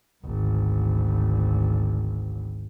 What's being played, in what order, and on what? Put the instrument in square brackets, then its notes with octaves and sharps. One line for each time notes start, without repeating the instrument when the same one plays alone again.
[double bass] G#1 D2